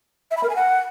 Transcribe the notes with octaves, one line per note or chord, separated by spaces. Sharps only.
E5
B5
A#4
G#5
F#5